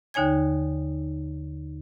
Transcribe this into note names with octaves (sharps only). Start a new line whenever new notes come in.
D#2 D3 D#4 C#5 G#5 G#6